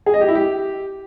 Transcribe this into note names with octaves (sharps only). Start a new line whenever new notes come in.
G#4
D#5
G4
E4
G4